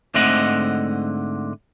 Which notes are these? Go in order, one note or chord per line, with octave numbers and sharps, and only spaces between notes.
G#2 D3 A3 C4 D#5 F#5